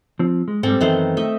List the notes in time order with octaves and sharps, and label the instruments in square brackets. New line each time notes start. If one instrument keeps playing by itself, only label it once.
[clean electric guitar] F3 C4
G#3
[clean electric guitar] G#2 G3 [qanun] C4 A4
[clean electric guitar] F#2 E3 B3 [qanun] D#3 A3 C5
[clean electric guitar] A3 [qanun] D#5 E5